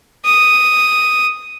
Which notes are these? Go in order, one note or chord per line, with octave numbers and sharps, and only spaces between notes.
D#6